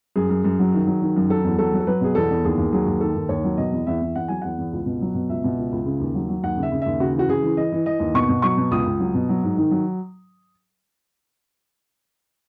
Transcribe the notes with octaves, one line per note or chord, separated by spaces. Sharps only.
F#2 G#4
F#2
F#2
F#3
D#3
F#3
D#3
F#2
F#3 A4
E2
F#3 A4
F#3
A4
F#3 B4
B2 G#4
E2 A4
E2
D#2 G#4
D#2
F#3 G#4
D#2
D#3 A4
D#2
D#2 C#5
F#3
B2 D#5
E2
E2 E5
E2
E2 F#5
F#3 G#5
E2 F#5
E2
C#2
B2
F#3
B2
C#2 E5
B2
C#2
C#2
C#3
D#2
F#3
F#3
D#2 F#5
C#3
E5
C#3
D#2 E5
C#3 F#4
E3 F#4
C#3 G#4
E3
E3 D#5
E3
E3 D#5
D#2
B2 C#6
B2
F#3 C#6
B2
C#2 D#6
C#2
F#3
B2
F#3
G#2
D#3
F#3